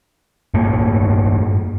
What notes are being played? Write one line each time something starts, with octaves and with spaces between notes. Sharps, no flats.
G2 A3 A#3